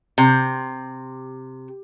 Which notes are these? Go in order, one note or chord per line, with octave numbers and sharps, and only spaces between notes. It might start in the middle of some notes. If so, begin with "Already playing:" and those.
C3